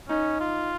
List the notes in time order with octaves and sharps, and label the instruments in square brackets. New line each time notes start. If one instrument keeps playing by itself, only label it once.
[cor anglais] C#4 [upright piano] D#4
[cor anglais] F4